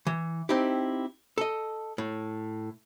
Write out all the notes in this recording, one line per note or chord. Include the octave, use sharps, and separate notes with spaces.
E3
C4 D#4 E4 G4
A4 D#5
A2